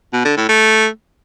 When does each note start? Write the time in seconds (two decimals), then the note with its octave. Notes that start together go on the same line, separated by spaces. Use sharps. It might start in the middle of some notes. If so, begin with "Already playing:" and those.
0.13 B2
0.25 D3
0.37 A2
0.49 A3